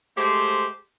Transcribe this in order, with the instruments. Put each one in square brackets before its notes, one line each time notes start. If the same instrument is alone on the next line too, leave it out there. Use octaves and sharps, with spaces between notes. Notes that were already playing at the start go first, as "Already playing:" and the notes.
[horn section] G#3 A3 G4 C5